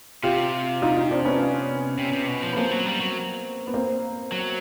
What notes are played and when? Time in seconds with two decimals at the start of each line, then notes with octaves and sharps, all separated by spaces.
0.23 C3 F4 G4
0.82 D#4 F4
0.96 D#4 F4
1.11 C4 D4
1.25 B3 C#4
1.98 C3
2.13 C3
2.28 B2
2.42 F3
2.53 B3
2.57 F3 A#3 C4
2.71 F#3
2.86 G3
3.01 F#3
3.67 B3
3.74 A#3 C4
4.32 F#3